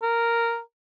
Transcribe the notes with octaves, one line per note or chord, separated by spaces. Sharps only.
A#4